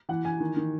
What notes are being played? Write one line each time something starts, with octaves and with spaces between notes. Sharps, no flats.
E3 F#5
E3 G#5
D#3
D#3